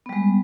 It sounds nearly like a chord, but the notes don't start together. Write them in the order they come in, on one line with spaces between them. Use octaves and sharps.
B3 G3 G#3